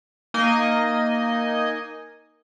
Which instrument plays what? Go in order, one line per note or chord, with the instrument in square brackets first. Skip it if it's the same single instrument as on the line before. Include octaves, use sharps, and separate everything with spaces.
[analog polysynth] A#3 D#4 D#5 G#5